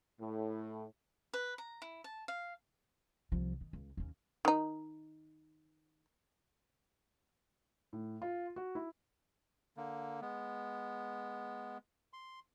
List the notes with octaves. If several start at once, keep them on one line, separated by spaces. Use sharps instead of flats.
A2
B4
A#5
E4
A5
F5
C2 F3
D#3
C#2
D#2 C#4
D#3 D#4
A2
F4
F#4
E4
D3 A#3
G#3 B3
C6